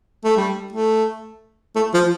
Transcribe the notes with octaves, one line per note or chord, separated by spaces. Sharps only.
A3
G3
A3
A3
F3